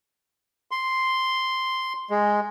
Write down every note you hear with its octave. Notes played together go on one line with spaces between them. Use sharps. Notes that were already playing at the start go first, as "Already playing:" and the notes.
C6
G#3